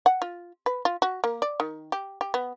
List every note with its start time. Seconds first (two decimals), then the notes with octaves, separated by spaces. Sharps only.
0.06 F#5
0.22 F4
0.66 B4
0.85 F4
1.02 F#4
1.24 A#3
1.42 D5
1.60 D#3
1.92 G4
2.21 G4
2.34 B3